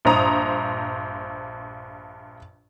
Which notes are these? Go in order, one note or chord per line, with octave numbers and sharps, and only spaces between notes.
A#1 G2 C5 A#5 D#6